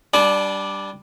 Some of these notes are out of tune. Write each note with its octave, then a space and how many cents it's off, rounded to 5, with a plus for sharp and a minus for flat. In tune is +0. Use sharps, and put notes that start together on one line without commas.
G3 +0 D4 +0 A5 -40